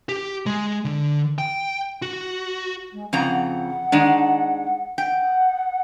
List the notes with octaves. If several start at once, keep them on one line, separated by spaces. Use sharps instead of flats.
G4
G#3
D3
G5
F#4
G#3
F2 C#3 F#5 A#5
D#3 G#3 D4
F#5 G5